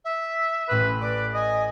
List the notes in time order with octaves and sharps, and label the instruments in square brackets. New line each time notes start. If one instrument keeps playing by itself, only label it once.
[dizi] E5
[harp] A1 A2 D#6 [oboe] B4
[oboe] B4 [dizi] D5 [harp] D6
[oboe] D#5 [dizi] G#5